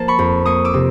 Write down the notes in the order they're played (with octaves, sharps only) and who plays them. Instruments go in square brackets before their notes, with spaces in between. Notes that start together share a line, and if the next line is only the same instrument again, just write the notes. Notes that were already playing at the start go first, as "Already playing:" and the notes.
Already playing: [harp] F3 A#3 A5
B5 C#6
F2
A#3 C#6 D#6
D6 E6
C3